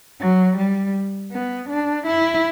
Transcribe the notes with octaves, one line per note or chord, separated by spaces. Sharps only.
F#3
G3
B3
D4
E4